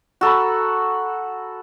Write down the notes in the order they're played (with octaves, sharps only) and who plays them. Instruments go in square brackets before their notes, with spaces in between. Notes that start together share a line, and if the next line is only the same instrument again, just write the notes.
[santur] F#4 A4 A#5 B5